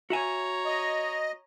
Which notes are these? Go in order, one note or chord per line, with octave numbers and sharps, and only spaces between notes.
F#4 C#5 E5 G#5 A#5
D#5